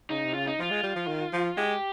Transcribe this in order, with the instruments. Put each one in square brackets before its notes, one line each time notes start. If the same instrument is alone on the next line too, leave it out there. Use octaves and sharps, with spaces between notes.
[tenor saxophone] C#3 [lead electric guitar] D#4
[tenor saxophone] C3
[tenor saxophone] C#3 [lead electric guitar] F4
[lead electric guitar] D#4
[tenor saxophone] F3 [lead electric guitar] F4
[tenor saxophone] G#3
G3
F3
D#3
F3
[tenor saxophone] G#3 [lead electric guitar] G4